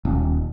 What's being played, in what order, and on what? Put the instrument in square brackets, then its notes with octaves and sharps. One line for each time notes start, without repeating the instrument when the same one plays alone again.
[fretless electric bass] D#1